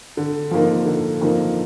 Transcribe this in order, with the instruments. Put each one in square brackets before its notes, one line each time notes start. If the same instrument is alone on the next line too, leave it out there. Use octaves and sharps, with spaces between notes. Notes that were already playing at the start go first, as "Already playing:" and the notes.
[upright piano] D3
F3 A#3 D#4
D3
F3 A#3 D#4